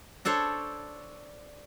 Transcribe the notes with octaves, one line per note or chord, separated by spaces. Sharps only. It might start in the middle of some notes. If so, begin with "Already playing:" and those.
D4 A4 C5 C#5